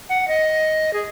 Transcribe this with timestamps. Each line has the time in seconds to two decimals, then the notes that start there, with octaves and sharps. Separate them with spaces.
0.09 F#5
0.28 D#5
0.93 G#4